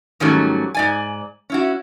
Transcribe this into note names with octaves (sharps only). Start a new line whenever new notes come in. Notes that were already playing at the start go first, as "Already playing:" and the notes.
G#2 D#3 F#3 G3 A3 C#4
G#2 D5 G#5
C#4 E4 F#4